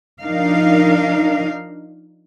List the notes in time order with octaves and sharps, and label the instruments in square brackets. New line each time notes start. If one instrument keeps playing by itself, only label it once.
[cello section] F3 D4 D#4 A#4 F5